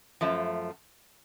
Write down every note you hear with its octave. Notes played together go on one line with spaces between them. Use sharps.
F#2 F3 A3